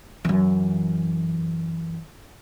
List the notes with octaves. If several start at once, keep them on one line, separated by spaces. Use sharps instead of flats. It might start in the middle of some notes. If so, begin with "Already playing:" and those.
F#2 E3